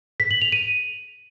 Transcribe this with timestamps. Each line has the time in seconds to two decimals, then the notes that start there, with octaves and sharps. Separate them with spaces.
0.20 B6
0.31 F#7
0.42 F7
0.52 D#7